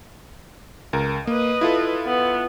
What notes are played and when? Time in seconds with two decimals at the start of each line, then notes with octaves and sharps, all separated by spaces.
0.93 C#2 A#4
1.27 A#3 B4 D#5
1.61 E4 F4 A4
2.06 B3